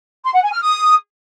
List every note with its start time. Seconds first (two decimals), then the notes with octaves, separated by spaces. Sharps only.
0.24 C6
0.34 F#5
0.43 G#5
0.52 F6
0.62 D#6